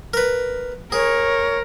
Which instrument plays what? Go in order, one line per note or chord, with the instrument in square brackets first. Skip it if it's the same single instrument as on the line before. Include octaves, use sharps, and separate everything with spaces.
[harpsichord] A#4 B4
[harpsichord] G#4 [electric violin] A#4 [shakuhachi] C#5